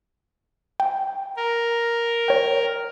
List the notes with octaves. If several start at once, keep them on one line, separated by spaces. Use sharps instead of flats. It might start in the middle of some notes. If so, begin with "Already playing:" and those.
G5
A#4
C#5 G5